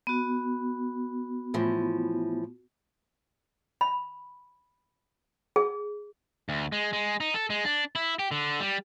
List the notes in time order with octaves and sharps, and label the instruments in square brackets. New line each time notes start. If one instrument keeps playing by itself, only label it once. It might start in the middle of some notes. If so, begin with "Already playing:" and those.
[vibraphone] B3 F#4
[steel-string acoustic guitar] A2 E3 F3
[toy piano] B5
G#4
[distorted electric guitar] D2
G#3
G#3
D#4
A4
G#3
D4
E4
G4
D3
G3